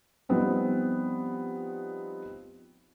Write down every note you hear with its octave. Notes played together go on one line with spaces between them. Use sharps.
F3 G3 B3 C4 D#4